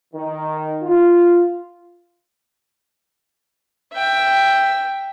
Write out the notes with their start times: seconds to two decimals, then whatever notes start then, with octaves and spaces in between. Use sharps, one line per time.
0.14 D#3
0.82 F4
3.93 E5 G5